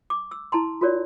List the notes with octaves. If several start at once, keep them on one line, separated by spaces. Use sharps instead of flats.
D6
E6
E4 A5 A#5 C6
F4 F#4 A#4 C#5 D5